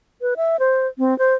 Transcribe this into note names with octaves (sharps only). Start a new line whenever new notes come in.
B4
E5
C5
C4
C5